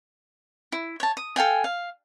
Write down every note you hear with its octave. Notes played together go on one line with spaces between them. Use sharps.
E4
C#5 A5
D#6
A4 F5 G5 G#5
F5